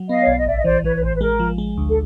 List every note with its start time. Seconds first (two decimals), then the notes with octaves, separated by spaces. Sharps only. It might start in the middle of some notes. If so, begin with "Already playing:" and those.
Already playing: F#3
0.08 B3 D#5 F5
0.21 C#5
0.27 B1 D5
0.38 D#5
0.46 A1 D5 E5
0.58 D#5
0.64 E3 C5 D5
0.84 E3 B4 C#5
0.96 B4
1.02 A1 C5
1.16 B4
1.21 G#3 A#4
1.39 F3
1.58 G#3
1.78 D2
1.89 A4